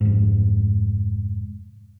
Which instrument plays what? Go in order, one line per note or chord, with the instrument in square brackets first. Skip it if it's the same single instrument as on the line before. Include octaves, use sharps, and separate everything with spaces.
[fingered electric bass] F1 G#2